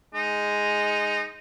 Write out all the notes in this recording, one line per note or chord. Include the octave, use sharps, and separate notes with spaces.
G#3 D#4